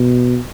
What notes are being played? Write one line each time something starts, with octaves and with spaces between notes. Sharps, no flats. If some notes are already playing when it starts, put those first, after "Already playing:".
Already playing: B2